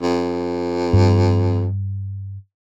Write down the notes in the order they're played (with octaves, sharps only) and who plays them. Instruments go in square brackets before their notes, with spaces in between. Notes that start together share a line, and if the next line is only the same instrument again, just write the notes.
[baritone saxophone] F2
[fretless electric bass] G2